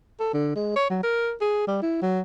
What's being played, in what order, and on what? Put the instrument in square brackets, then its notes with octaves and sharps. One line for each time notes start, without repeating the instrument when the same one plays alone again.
[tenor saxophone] A4
D3
G#3
C#5
F#3
A#4
G#4
G3
E4
F#3